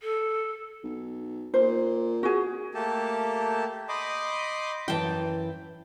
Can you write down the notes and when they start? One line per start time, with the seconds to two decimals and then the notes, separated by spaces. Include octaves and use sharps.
0.01 A4
0.83 B1
1.54 A#2 C5
2.23 F#4 G#4
2.74 A3 A#3 G4 A4 A5
3.89 D#5 B5 C6 D6 D#6 G6
4.88 F#2 E3 G5 A5